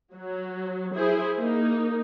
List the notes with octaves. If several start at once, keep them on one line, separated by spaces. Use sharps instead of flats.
F#3
E4 G#4 C5
A#3 D#4